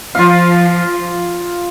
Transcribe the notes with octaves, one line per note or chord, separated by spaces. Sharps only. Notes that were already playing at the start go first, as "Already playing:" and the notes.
F3 F4 F5